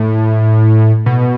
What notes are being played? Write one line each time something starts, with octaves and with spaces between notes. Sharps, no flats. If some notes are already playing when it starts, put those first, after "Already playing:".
Already playing: A2
B2